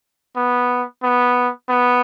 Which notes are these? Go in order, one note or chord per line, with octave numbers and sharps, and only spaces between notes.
B3
B3
B3